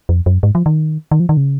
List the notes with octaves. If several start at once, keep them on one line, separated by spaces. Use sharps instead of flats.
F2
F#2
G#2
F3
D#3
D#3
F3
D#3
C#3